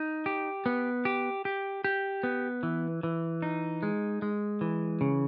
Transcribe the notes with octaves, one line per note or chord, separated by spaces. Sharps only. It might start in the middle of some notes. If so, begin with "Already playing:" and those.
Already playing: D#4
G4
B3
G4
G4
G4
B3
E3
E3
D#4
G#3
G#3
E3
C#3